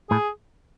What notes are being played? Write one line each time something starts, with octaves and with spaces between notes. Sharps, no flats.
A2 G#4